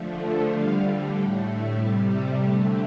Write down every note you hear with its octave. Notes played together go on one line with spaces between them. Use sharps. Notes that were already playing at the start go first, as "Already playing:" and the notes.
Already playing: D3 F3 A3
D3 G3 F5
A2 A3 A4
C3 G3 G4
A4
D3 A3 G4